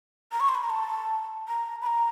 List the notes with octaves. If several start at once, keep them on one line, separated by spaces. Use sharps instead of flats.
A#5
C#6
C6
B5
A#5
A5
A#5
B5
A#5